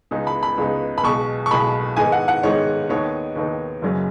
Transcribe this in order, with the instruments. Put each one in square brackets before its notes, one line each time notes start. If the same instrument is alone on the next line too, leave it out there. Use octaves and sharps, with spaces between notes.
[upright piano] C#2 C#3 G#3 B3 D#4
B5
B5
C#2 C#3 G#3 B3 D#4
B5
B1 B2 G#3 C#6
C#6
B1 B2 G#3 B5
G#2 D#3 G#3 B3 D#4 G#5
F#5
F#5
G#2 D#3 G#3 B3 D#4 C#5
D#2 D#3 B3 D#4 C#5
D#2 D#3 B3 D#4
F#1 F#2 C#3 F#3 C#4